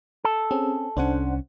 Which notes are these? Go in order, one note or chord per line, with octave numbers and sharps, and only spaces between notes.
A4
C4 C#4 G#4
C2 C#4 D4 C5 F#5